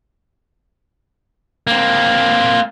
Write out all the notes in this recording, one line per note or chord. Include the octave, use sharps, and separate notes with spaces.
A#3 C4